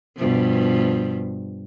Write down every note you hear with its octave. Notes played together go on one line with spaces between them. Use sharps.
G2 B2 F3